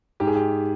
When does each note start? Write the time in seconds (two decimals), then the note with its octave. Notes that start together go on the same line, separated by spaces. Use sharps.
0.20 G#2 G4
0.27 G#4
0.35 G4